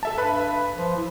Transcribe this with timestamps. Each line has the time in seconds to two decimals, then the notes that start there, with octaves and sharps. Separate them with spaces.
0.03 A4 E5 A5
0.18 G2 B4 B5 F#6
0.76 F3
0.97 E4